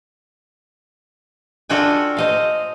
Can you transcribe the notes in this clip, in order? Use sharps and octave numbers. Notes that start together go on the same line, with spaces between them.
D4 F4 F#4 A4 G5 G#5
C5 D#5 F5